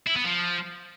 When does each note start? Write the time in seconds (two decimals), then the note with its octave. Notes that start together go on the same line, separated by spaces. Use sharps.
0.07 E4
0.16 B3
0.25 F3